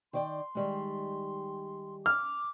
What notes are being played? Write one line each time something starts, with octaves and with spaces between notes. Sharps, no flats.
D#3 D5 G5 C6
D#3 G3 G#3
D6 F6